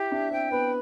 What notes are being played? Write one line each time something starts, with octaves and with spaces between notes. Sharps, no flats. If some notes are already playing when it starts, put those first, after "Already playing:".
Already playing: E4 G4
D4 E5
C4 G5
B3 B4